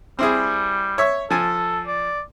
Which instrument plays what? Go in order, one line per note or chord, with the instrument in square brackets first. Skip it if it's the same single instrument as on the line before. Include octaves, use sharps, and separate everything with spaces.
[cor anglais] G3 [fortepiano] C4 E4 G#4
[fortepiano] C#5 E5 C#6
[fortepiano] F3 G#5 [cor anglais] A4
[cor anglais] D5